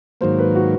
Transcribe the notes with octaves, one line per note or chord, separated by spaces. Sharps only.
G#2 D#3 F#3 A#3 C5
B4
F#4